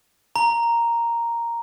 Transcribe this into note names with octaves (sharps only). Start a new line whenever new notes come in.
A#5